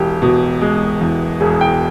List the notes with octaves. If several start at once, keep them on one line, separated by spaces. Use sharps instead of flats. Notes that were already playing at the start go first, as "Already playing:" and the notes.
Already playing: E1 G4
B2
G#3
E2
E1 G#4
G5